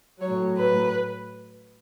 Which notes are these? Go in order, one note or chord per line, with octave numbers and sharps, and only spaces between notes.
A2 F#3 C#5
B4